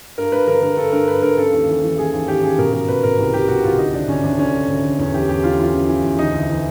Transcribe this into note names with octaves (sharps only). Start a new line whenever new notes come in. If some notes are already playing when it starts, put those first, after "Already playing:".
G2 A#4
G2 B4
D3 A#4
D3 A#4
G2 A4
G2 A#4
G2 B4
G2 A#4
C#3 A4
D#2
E3
E3
C#3 G#4
D#2
D#2 G4
C#3 G#4
B2 A#4
B2 A#4
B2 B4
B2 A#4
C2
C2 G4
B2 F#4
C2 F4
D2 D#4
D2 D4
D2 C#4
D2 D4
D3 C#4
D3
D2
D3
E2 C#4
E3 G4
E2 G4
E3 F4
E3 F4
C#3
E3
E2
D2 D#4
D2
E3